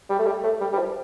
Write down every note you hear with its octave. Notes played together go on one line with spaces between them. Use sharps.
G3
A3
G3
A3
G3
G3
F3